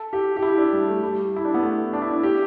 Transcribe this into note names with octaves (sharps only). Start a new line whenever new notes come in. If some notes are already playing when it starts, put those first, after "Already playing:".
Already playing: A4
G4
G4
E4
D4
G3
A3
G3
E4
D4
B3
A3
D4
E4
D4
G4